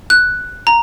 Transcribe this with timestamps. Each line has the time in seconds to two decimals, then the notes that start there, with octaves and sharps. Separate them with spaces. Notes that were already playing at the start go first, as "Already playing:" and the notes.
0.10 F#6
0.67 A#5